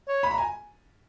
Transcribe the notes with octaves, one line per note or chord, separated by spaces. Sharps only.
C#5
B5
A#5
G#5